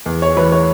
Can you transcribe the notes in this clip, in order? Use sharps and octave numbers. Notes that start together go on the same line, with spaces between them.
E2
C#5
E3 B4
C#5